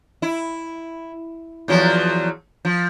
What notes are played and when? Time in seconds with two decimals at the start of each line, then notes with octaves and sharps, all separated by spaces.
0.22 E4
1.68 E2 F3 F#3
2.65 F3